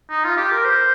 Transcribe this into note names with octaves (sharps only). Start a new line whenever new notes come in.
D#4
F4
G4
A#4
C5